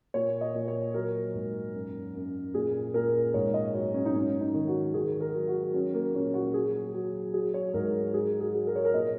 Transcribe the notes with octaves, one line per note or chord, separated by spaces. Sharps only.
A#2 C#5
D#5
A#2
C#5
F#3 A#4
G#2
F#2
F#2
A#2 G#4
A#2 A#4
G#2 C#5
D#5
F#3 C#5
C#4
D#4
G#2 C#4
D#4
D#3
F#4
D#3 G#4
A#4
F#3
F#4
F#3 C#4
A#3
A#2 C#4
F#4
F#3 G#4
F#3
F#3 G#4
C#5
G#2 A#4
F#3 G#4
G#4
F#3
A#4
C#5
A#4
A#2 D#5